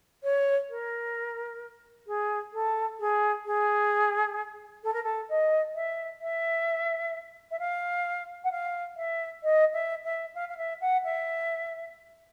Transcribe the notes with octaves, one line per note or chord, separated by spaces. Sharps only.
C#5
A#4
G#4
A4
G#4
G#4
A4
A#4
A4
D#5
E5
E5
E5
F5
F#5
F5
E5
D#5
E5
E5
F5
F5
E5
F#5
E5